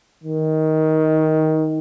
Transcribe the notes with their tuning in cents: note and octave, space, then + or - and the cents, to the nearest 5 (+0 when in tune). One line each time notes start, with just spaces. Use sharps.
D#3 +15